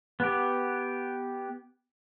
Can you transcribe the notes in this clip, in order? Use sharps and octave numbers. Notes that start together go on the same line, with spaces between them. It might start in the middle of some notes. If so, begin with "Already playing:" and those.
B3 G4